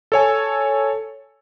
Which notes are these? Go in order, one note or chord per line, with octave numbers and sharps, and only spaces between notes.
A4 C#5 G#5